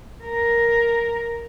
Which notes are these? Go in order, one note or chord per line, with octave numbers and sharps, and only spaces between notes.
A#4